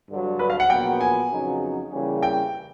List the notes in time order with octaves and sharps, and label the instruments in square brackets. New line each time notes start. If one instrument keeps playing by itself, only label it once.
[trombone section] G2 D3 F#3
[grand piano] B4
F5
F#5
[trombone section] A#1 A#2 F#3 B3 [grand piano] G5
[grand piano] G#5
[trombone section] F2 C#3 F#3 B3 D#4
C#3 E3 G3 A#3 C#4
[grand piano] G5